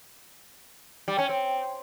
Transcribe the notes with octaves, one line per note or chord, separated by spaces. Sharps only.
G3
C#4
C4